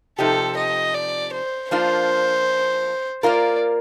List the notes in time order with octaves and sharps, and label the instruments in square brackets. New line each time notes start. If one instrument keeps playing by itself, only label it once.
[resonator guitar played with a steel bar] C3 F3 C4 D#4 G4 [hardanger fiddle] A4
[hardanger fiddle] D#5
D5
C5
[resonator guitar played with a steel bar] F3 A#3 D4 F4 [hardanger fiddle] C5
[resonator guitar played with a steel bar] A#3 F4 A#4 [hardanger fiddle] D5